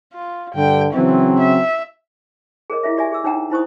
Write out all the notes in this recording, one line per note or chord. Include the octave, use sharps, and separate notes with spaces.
F4
G2 D3 G5
C#3 E3 F#3 C4
E5
G#4 A#4 C#5 D#5
E4 F4 G#4 C#5 E5
G4 D5 E5 G#5
G#4 E6
D4 D#4 C#5 F#5 G5 A#5
D#4 E4 C5 C#6 D#6